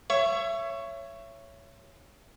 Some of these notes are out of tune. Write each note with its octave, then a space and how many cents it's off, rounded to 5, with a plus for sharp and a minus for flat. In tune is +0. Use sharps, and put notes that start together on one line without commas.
C#5 +0 E5 +30